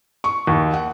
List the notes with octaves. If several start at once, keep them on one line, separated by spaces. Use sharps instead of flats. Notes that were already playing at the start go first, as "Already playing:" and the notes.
C#6
D#2
F#5